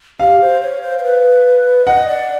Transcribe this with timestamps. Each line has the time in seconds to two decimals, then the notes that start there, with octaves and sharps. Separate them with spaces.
0.19 G4 F5
0.41 C5
0.62 C#5
0.82 C5
0.99 C5
1.03 B4
1.86 D#5 F#5
2.08 D5